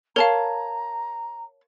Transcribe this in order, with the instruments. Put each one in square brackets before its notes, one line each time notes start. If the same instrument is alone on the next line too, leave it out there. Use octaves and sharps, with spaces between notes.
[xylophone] A#4 F5 [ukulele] C#5 A5 [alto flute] A#5